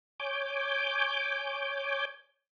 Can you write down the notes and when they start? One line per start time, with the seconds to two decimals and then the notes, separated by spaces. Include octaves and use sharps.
0.20 C#5 G#5 D6 G6